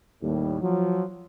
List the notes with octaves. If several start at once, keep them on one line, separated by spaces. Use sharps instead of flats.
D#2 A2 G3
F3 F#3